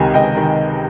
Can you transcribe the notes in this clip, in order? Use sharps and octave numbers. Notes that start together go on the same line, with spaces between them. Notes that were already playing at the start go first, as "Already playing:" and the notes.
Already playing: C#2 C3 D#3 G#5
C#2 D#5 G5
C3 D#3